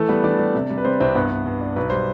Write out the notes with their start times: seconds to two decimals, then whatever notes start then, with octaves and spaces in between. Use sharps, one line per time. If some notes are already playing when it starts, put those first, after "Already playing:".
Already playing: E3 A3 A4
0.09 G3 B3 B4
0.24 E3 D4 D5
0.39 G3
0.55 C3
0.70 G3
0.78 B4
0.85 G3 C4 C5
1.00 C2 C4 C5
1.15 G2 B3 B4
1.31 G2
1.46 G2
1.61 D4
1.76 B1 B4
1.90 G3 C5